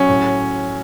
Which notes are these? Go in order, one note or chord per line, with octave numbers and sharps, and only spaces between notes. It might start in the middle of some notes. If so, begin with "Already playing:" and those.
Already playing: F#3 C#4
A2